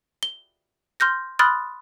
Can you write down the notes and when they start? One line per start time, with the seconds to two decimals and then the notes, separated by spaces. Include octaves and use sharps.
0.23 G7
1.00 C6 F6 G6 A#6
1.39 B5 C6 D#6 F6 F#6 A6